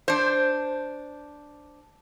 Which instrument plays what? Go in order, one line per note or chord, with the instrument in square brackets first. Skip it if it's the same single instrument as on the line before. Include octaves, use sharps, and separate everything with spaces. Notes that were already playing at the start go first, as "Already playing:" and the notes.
[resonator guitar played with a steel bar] D4 C5